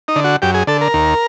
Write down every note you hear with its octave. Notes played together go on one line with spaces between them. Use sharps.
D#4
D3
F#4
F#2 G4
G#4
D3 A4
A#4
D#2